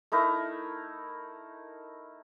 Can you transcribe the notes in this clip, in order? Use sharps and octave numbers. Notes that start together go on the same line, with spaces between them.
A3 D#4 E4 A#4